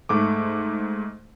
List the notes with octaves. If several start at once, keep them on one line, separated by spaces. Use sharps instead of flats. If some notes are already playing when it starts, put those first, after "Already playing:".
G#2 A3 D6